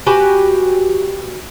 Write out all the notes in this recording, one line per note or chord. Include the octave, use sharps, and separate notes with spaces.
F#4 G4 B4 G#5